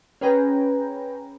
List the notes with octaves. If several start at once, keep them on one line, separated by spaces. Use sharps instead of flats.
C#4 G#4 B4 G5 A#5